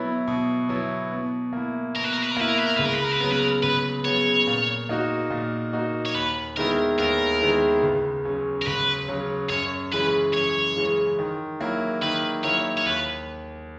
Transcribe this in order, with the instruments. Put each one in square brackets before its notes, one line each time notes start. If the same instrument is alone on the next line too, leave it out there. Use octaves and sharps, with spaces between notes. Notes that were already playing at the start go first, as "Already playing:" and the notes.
Already playing: [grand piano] B2 F#3 B3 E4
B2
F#3 B3 E4
B2
A#3 E4
[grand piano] B2 [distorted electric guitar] A#4
[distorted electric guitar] B4
A#4
B4
A#4
[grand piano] A#3 E4 [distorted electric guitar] B4
[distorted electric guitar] A#4
B4
A#4
[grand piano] C#2 [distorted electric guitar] B4
[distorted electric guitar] A#4
B4
A#4
B4
[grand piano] C#3 F#3 B3 [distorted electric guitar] A#4
[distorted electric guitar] B4
A#4
[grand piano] C#2 [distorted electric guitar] B4
[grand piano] C#3 F#3 B3 [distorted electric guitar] C#5
[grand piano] A#2
A#3 D#4 F#4
A#2
A#3 D#4 F#4
[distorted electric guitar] C#5
[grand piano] D#2 [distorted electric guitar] B4
[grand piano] D#3 G#3 B3 E4 [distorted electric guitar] A#4
[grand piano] D#2 [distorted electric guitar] A#4
[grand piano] D#3 G#3 B3 E4
C#2
C#3 F#3 C#4
[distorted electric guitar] A#4
[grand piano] C#2 [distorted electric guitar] B4
[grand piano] C#3 F#3 C#4
[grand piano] F#2 [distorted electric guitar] C#5
[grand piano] C#3 E3 G#3 C#4 [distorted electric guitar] B4
[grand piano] F#2 [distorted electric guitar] C#5
[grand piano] C#3 E3 G#3 C#4
D#3
F#3 A#3 E4
[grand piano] D#3 [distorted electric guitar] B4
[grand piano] F#3 A#3 E4 [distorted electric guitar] C#5
[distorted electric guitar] C#5
[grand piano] D#2 [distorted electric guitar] B4